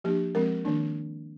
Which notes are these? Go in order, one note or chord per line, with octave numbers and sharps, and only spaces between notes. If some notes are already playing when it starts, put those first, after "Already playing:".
F3 A#3 D4 G4
F3 G#3 C4 A#4
D#3 A#3 D4